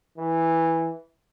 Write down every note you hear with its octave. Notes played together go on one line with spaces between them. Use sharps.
E3